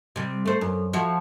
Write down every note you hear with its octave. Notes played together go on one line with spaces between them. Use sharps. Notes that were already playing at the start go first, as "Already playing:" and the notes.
C3 G3
A3 C5
F#2
F3 E4 F#4